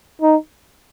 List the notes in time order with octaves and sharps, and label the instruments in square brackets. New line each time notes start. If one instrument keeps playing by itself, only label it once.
[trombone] D#4